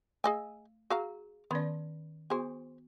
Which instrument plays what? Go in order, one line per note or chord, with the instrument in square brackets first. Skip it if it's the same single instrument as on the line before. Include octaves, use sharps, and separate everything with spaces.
[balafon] A3 [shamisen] G#4 D#5 G#5
[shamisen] F#4 F5 A#5 [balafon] G#4
[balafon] D#3 C#4 D5 [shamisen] B3
[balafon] B3 F#4 [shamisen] G#4 C5